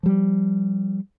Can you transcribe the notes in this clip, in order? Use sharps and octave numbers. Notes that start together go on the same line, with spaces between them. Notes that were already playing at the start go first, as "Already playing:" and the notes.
F3 G3